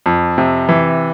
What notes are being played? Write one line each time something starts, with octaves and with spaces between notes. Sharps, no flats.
F2
C3
E3